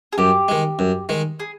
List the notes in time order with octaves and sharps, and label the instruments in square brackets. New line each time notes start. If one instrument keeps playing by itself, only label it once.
[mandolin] G#4
[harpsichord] F#2 [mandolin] G4
[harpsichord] D#3 G#3
F#2
D#3 G#3
[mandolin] G#4